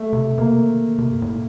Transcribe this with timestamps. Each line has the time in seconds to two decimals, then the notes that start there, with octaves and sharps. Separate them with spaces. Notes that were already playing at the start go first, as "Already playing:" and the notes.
Already playing: A3
0.13 C3
0.38 C3 A#3
0.62 D#3
0.86 C3
0.98 C3
1.11 G2
1.22 A2